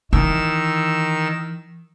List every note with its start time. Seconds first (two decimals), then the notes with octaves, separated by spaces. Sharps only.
0.13 D#3 E3 E6